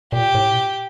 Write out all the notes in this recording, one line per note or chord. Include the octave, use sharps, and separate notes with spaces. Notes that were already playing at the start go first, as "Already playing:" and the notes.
A#2 G4
A2
B2
A#2